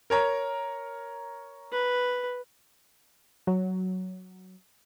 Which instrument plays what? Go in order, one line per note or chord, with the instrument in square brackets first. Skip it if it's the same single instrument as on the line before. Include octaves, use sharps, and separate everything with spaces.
[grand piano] A#4 C#5 A#5
[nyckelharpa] B4
[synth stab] F#3